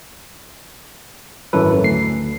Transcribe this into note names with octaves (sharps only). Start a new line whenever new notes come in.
G#1 F#2 E3 F#3 A4 B4
D2 C7